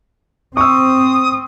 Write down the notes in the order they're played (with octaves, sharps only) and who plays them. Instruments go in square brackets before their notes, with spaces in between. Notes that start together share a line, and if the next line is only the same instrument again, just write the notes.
[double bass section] C4 [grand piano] C#6 E6 [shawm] D#6